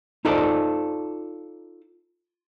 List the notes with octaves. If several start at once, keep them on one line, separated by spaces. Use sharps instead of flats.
D#4 F4 A4 C5 D5